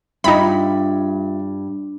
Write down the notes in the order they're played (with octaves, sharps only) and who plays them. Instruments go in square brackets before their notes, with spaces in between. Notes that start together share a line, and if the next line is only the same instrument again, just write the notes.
[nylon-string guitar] G2 [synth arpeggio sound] D#4 B5 [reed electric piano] F4 E5